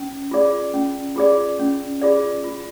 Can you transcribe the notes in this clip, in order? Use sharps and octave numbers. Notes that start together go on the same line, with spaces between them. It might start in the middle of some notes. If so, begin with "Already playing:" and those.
Already playing: C#4
F4 G#4 D5
C#4
F4 G#4 D5
C#4
F4 G#4 D5
F4